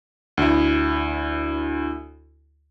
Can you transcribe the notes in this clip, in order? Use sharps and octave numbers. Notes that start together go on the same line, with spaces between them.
D2 E4